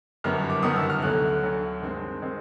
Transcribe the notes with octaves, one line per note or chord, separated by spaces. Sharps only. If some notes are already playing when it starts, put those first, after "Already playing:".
G1 F#2 D#3 G3 B3 F6
D6
G1 F#2 D#3 G3 B3 D#6
E6
F6
D2 D3 F#3 A3 F#6
D2 D3 F#3 A3
G2 D#3 G#3 C4
D#3 G#3 C4